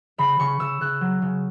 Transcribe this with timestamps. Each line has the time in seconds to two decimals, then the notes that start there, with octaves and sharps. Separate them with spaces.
0.18 C#3 B5
0.39 C#3 C#6
0.60 C#3 E6
0.81 C#3 F#6
1.01 F#3
1.22 C#3